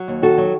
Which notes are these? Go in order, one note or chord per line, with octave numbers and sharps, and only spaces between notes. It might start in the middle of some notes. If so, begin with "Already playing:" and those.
Already playing: F#3
D#2
D#3 F#4 A4
F#3